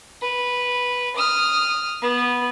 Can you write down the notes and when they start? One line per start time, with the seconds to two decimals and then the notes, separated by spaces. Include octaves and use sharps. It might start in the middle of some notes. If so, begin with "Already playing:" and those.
0.22 B4
1.16 D#6 F6
2.02 B3